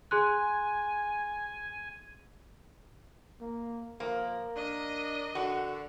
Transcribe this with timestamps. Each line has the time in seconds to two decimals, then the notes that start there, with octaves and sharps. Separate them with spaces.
0.11 G#4 G#5 C6 F#6
3.41 A#3
4.00 F3 A#3 A#4
4.56 D4 D#5
5.35 D3 F#4